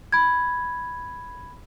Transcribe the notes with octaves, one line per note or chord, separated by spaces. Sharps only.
B5 G#6